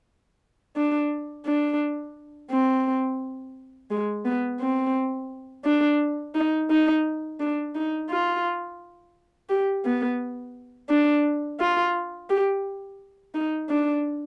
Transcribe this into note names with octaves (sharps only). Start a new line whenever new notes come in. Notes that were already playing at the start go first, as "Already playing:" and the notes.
D4
D4
C4
G#3
B3
C4
D4
D#4
D#4
D4
D#4
F4
G4
B3
D4
F4
G4
D#4
D4